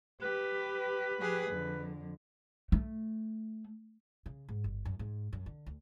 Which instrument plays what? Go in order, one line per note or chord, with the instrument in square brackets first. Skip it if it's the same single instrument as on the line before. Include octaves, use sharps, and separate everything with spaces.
[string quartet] G4 [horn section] B4
[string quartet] F3 G4 G#4
F2 D3
[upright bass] A3
C#3
G#2
G1
F#2
G#2
F#2
D3
D2